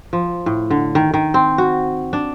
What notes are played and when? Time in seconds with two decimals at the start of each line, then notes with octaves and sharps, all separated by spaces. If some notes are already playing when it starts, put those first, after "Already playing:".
0.13 F3
0.46 A2
0.70 D3
0.95 D#3
1.14 D#3
1.34 C4
1.58 F#4
2.13 D4